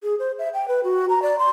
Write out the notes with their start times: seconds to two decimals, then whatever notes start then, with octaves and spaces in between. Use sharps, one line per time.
0.03 G#4
0.19 C5
0.39 E5
0.54 G5
0.68 B4
0.84 F#4
1.09 A#5
1.22 D5
1.39 C6